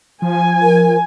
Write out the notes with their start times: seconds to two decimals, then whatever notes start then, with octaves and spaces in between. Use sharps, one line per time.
0.22 F3 G#5
0.62 A#4